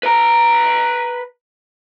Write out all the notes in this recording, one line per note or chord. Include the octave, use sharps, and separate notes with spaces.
B4 A#5